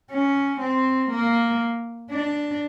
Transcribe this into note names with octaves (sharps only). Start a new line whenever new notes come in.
C#4
C4
A#3
D4